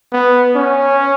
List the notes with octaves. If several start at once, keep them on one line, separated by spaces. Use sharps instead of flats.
B3
C#4